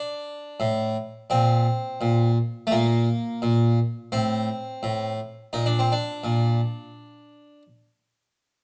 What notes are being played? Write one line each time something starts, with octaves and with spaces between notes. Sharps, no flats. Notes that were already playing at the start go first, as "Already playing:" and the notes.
Already playing: D4
A2
A#2 C4
A#2
A3
A#2 A#3
A#2
A2 C4
A2
A#2 D#4
D4
C4
D4
A#2